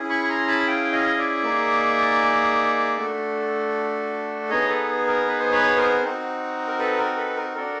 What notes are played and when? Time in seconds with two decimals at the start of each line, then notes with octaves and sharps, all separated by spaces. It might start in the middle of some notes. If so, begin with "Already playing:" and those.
Already playing: C#4 E4 G#4
0.10 B5 C#6
0.24 B5
0.29 A#5 C6
0.48 A5 B5
0.67 F5 G5
0.92 D#5 F5
1.18 D5 E5
1.43 A#3 D#4 G#4
2.97 A3 D4 F#4 A4
4.49 B3 D#4 G#4 C#5 D#5
4.68 A4 B4
5.07 A#4
5.28 B4
5.39 C5
5.51 B4 C#5
5.77 A#4 C5
6.03 C4 D#4 F#4
6.68 A#4
6.79 A4 B4
6.98 A#4
7.17 A4 B4
7.36 A#4
7.55 D4 F#4 A4 A#4